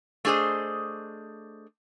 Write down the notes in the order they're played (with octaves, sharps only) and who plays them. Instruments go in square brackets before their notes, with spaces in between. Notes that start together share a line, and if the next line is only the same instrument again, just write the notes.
[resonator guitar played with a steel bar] A3 D4 G#4 C5 D#5